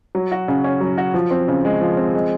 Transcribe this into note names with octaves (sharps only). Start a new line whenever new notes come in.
F#3
F#4
C#3
C#4
F#3
F#4
F3
C4
C#3
G#3
F3
C4
G#3